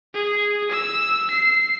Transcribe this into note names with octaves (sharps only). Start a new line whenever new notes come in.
G#4
E6
C7